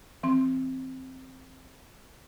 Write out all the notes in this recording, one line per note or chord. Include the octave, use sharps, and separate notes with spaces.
E3 C4 C6